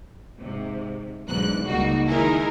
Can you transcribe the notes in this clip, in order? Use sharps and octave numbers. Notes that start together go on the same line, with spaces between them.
G#2 C3
B1 E2 G#2 D3 F#6
C#2 G3 A#3 D#4 F#4
D#3 G#3 D#4 E4 G#4 A#4